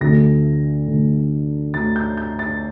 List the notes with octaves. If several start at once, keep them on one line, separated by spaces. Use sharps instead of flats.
D2 D3 A3 A#6
D2 D3 A3
D2 D3 A3 A6
G6
G6
A6